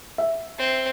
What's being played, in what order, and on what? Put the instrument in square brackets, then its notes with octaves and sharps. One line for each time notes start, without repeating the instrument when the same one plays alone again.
[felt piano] E5
[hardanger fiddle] C4